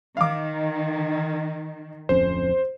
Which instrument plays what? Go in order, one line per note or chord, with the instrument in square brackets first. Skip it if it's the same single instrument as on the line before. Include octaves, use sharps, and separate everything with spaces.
[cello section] D#3 [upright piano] F5 D6
[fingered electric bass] D1 F2 C#4 [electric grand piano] C5